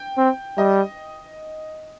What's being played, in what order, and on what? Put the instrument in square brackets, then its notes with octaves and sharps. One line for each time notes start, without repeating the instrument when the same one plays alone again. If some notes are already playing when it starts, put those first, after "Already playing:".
Already playing: [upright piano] G5
[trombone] C4
[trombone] G3 [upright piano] D#5